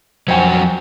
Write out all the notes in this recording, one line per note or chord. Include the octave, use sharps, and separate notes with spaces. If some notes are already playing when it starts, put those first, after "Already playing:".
F2 F#3 F#4 C5 G5 G#5